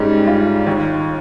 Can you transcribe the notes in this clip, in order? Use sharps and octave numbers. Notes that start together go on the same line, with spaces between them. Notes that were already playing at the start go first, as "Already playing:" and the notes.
Already playing: G#2 G3 C#4
F4
D#2